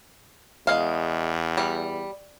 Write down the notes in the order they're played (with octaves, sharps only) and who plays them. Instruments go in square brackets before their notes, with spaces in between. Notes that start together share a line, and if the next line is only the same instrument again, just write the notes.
[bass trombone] E2 [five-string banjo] G#3 F5
[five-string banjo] G3